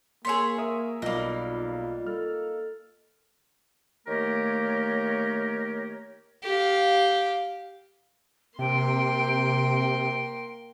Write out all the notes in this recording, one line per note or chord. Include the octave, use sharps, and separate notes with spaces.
A#3 G#4 C#5 C6 E6 B6
A#4 E5 D#6
B1 G3 A#3 D#4 F4
A4 F6
D#3 A3 A#3 G4 A#4 C#5
G4 F5
C3 A#3 G5 C6